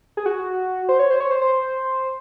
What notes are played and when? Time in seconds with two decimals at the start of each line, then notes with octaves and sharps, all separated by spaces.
0.17 G#4
0.26 F#4
0.89 C5
0.99 C#5
1.10 C5
1.20 C#5
1.31 C5
1.41 C5